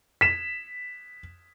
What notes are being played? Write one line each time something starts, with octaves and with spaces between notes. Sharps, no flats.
B6 E7